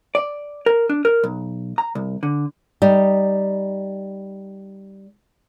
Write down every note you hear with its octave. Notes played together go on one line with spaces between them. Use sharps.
D5
A#4
D4
A#4
B1
A#5
C2
D3
G3 D#4